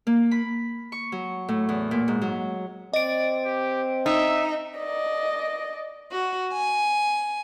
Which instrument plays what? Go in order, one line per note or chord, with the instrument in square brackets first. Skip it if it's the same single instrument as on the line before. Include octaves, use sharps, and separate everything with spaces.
[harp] A#3
B5
C#6
F#3
A2
E2
A#2
G#2
F#3
[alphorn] C4 [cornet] D5 [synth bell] D#5 D7
[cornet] G4
[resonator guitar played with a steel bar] D#4 [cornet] E5
[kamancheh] D5 D#5
[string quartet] F#4
G#5